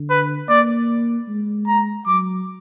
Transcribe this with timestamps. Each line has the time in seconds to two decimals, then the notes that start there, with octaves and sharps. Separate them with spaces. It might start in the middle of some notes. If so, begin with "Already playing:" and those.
Already playing: D3
0.10 B4
0.49 A#3 D5
1.28 G#3
1.67 A#5
2.07 F#3 D6